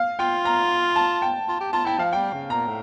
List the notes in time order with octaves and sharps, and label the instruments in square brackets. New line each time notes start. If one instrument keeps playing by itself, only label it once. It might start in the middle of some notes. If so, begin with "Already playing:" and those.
Already playing: [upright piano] F5
[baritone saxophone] F4 [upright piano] G5
[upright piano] A#5
A5
G5
[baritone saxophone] F4
G4
[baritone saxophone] F4 [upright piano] A5
[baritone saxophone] E4 [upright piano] G5
[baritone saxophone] F3 [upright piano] F5
[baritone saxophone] G3 [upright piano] G5
[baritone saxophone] C#3
[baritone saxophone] A#2 [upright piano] A#5
[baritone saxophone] A2